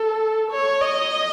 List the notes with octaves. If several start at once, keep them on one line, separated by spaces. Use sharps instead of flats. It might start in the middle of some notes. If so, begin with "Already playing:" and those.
Already playing: A4
C#5
D#5